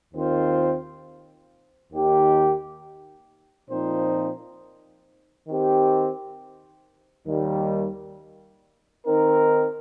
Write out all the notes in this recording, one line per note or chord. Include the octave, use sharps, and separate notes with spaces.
D#2 D#3 C4 F4 C5
D#2 D#3 A#3 G4
A#2 F3 C4 D#4 C5
D#3 C4 G4
D#2 D#3 G3
D#3 C4 D#4 A#4